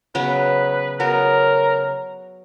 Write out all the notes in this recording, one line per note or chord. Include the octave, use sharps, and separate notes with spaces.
C#3 F#3 B3 B4
C#3 F#3 B3 A#4